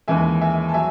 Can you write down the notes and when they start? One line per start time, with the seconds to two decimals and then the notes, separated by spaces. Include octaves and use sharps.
0.08 D#2 C#3 E3 G#3 E5 G#5
0.41 E5 G#5
0.69 A5
0.74 F#3 E5 G#5